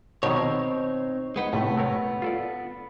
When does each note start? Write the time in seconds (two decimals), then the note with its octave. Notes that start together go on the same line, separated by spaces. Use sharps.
0.23 B2 D#3 C4 D#4 C#5
1.36 G#3 B3 D#4
1.53 A2 C3 A3 B3
1.78 A3 A#4 C#5
2.22 F4 A4 D5